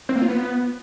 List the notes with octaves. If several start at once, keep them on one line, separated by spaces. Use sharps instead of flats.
C4
A#3
F4
B3